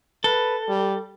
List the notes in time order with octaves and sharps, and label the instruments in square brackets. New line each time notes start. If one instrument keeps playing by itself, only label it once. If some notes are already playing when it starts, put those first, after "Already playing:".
[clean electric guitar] A4 [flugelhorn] B4
[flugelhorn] G3